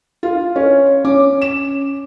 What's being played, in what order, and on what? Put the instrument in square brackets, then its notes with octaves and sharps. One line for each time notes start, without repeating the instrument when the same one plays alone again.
[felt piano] F4
C#4
[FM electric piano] C#4 [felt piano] D6
[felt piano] E7